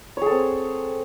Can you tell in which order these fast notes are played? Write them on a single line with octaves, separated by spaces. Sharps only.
C#5 G#4 A4 C4